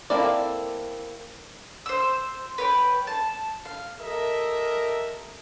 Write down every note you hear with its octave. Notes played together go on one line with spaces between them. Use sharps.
A#3 C4 E4 A4 D5
C5 E6
B4 C#5 G5
A5
F5
G4 A4 A#4 D#5 E5